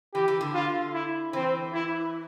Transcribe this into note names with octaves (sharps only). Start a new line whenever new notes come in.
E3 G4
E3
D3
F4
E4
E3 C4
E4